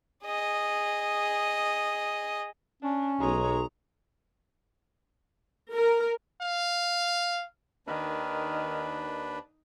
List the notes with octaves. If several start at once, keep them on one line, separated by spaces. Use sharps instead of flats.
G#4 D#5
C#4 D4
B1 G#3 C#5 A#5
A#4
F5
D#2 D#3 D4 B4